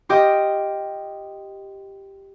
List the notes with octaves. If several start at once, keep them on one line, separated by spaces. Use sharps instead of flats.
F4 G4 D#5 G5